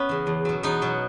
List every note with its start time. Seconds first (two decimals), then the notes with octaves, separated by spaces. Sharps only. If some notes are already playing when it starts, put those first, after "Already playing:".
Already playing: B3 C#4
0.09 C#3 E3
0.27 E2
0.45 B2 F#3
0.63 E2 B3 D#4
0.82 B2 F#3